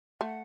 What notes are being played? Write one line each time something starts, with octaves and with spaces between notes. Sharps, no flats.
A3 F#5